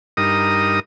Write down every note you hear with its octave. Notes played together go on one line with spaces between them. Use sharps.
G2 D#4 A#4 D#6